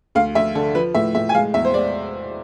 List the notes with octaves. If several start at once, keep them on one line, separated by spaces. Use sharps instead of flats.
D2 F5
D2 E5
D3 A4
F3 B4
A2 E5
A2 E5
G#5
G#3 F5
E2 E5
C5
G#3 D5